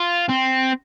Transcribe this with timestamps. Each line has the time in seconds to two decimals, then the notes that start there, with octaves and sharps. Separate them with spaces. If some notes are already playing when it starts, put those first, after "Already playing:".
Already playing: F4
0.29 C4